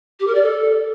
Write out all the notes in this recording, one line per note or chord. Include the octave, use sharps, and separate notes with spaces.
G4
A#4
D5
A4